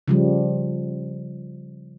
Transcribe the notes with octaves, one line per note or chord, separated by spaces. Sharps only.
C#3 F3 G3